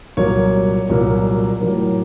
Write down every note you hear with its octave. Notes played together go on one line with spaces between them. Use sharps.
C2 A#2 F#3 A#3 C#5
C2 A#2 F#3 A#3
A2 F#3 A#3